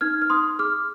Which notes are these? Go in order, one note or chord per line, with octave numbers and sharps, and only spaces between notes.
D#4 F6 G#6
F6
D#4 C6 D#6
G#4 D6 F6